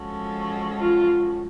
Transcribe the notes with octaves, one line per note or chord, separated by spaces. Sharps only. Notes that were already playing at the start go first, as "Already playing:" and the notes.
Already playing: F3 G#3 C#4 F#4 A4
F4